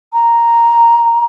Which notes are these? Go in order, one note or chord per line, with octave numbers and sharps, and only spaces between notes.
A#5